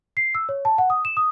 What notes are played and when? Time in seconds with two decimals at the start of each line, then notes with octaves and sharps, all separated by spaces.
0.17 C7
0.35 E6
0.49 C#5
0.65 A5
0.78 F#5
0.90 D#6
1.05 E7
1.17 D#6